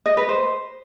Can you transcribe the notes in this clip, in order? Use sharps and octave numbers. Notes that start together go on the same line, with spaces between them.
D#5
B4
C5